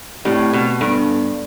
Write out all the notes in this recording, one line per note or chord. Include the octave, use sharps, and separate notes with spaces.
A2 A3 C4 G4 D5
B2
G2 B3 D4 A4